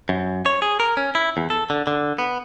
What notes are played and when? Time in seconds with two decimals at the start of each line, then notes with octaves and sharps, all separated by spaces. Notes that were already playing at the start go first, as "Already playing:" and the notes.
0.09 F#2
0.46 C#5
0.62 G#4
0.80 A#4
0.97 C#4
1.15 E4
1.37 E2
1.50 A4
1.70 D3
1.87 D3
2.18 B3